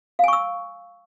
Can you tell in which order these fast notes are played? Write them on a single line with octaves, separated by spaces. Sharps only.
F5 G#5 C#6 E6